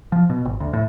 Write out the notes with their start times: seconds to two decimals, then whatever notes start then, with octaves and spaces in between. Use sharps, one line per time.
0.12 F3
0.30 B2
0.45 G#1
0.60 D2
0.73 A2